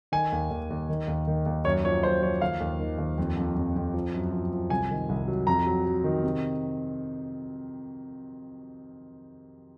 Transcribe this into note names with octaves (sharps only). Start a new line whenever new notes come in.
D#3 G#5
D#2
D#2
D#2
D#3
D#2
D#3
D#2
F#2 C#5
F3 C#5
F#2 C5
F3 C#5
D#2 F5
D#2
D#3
D#2
F2
F2
F2
F2
F3
F#2
F3
F3
C2 G#5
D#3
C2
F#3
F2 A#5
F#3
F#3
D#3
C3